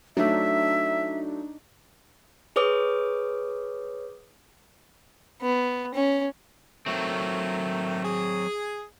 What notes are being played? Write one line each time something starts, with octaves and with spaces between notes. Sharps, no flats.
F#3 A3 D4 D#4 E5
G#4 B4 C#5 D6 D#6
B3
C#4
D#3 F#3 A3 C4
G#4